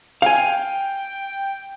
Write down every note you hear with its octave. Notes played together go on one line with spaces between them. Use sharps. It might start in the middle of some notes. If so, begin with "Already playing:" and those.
F5 G5 G#5